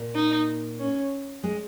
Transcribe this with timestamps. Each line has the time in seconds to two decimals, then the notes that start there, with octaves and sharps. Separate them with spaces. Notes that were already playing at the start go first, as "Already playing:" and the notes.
Already playing: A#2 A#3
0.15 D#4
0.79 C#4
1.43 G#3